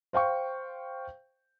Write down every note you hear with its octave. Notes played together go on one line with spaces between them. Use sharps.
C5 F5 G5 C#6